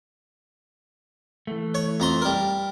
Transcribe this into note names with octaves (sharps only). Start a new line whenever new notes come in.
E3 A3
C#5
F2 A#5 C6
G3 A#4